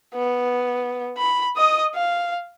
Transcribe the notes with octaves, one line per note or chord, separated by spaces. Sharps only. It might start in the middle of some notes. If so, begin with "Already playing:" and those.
B3
B5
D#5 D#6
F5